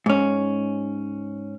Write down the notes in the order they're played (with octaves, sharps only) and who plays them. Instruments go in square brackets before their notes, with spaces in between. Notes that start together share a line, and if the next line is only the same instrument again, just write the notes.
[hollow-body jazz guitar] G#2 C#4